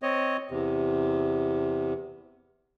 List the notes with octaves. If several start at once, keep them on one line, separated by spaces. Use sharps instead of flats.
C4 C#5 D#5
E2 C3